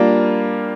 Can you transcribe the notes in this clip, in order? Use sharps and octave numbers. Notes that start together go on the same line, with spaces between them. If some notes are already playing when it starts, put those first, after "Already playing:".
Already playing: G3 A#3 D4 F4